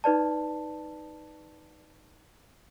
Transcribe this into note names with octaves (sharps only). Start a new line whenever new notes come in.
D#4 B4 D5 A5